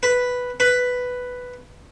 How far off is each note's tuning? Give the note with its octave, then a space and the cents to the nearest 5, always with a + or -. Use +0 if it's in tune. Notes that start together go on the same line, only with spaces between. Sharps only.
B4 +0
B4 +5